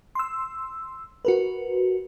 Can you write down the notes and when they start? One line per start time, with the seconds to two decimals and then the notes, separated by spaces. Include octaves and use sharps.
0.15 C6 E6
1.25 F#4 A#4 B4